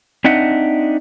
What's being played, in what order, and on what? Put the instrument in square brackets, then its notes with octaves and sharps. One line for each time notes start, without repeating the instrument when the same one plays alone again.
[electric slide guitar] C4 D4 D#4 D#5 E5 F#5